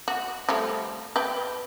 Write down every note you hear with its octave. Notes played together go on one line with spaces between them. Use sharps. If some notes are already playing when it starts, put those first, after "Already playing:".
F#4
F3 G3 A3
B4 G5